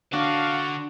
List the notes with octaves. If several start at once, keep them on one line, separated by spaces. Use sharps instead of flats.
D3 D4 F#4 F5